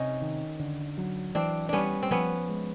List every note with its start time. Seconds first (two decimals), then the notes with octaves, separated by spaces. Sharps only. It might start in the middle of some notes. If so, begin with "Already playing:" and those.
Already playing: C3 C#4 D#4
0.22 D#3
0.60 D3
0.98 F#3
1.35 E3 C4 D4
1.69 G3 B3 C#4 D4
2.03 C4
2.11 F3 B3 C#4
2.49 G#3